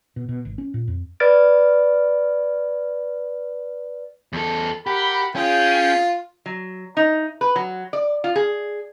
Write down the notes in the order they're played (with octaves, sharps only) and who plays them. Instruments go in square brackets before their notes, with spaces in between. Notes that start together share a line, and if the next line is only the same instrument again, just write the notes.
[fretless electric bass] B2
B2
G#1
C#4
A#2
F2
[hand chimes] B4 D5 F6 A6 D7
[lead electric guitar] E2 A4
[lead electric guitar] G4 [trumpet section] A#4 F#5 B5
[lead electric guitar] C#4 [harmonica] F4 [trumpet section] G#4 G5
[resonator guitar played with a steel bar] F#3
D#4
B4
F#3
D5
F4
G#4